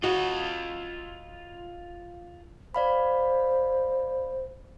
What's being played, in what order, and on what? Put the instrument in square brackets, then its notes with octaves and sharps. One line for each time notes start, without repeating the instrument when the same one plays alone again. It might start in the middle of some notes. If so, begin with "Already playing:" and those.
[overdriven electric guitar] F4 D#5 [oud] F#4
[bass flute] C5 [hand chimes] D5 F5 B5